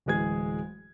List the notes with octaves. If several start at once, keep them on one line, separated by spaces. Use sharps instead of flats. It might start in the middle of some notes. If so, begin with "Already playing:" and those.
D1 E3 G#3 G#4 G#6